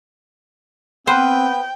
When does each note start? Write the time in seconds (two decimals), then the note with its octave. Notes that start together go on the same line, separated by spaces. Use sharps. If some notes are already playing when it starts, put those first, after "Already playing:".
1.07 B3 C4 B4 C5 G5 F6